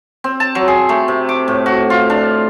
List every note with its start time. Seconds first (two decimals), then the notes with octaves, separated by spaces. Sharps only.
0.24 C4
0.40 A5
0.55 F#3
0.68 G#4
0.89 A3
1.08 C3
1.29 D6
1.48 A2
1.66 F#4
1.90 F4
2.10 D4